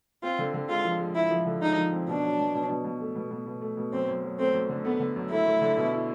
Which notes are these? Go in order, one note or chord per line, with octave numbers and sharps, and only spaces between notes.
C4 F4
D3
D3
G#3 F4
F3
G#3
G#3 E4
F3
D3
G#3 D#4
F3
C4
B2 D4
F#3
B2
B2
B2
B2
A3
B2
B2
B2
A3
B2
F#2 C4
F#2
F#3
A3 C4
F#2
D3
A3 B3
D3
F#2
A3 E4
A3
D3
B2
E4